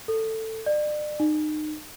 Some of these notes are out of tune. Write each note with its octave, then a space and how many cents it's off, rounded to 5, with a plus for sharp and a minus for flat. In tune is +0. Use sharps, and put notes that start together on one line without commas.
A4 +15
D5 +35
D#4 -30